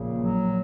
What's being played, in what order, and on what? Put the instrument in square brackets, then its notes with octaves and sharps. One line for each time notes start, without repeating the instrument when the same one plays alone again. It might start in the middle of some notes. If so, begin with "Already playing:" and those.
Already playing: [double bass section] A#1 A#2 [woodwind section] C#3
[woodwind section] F#3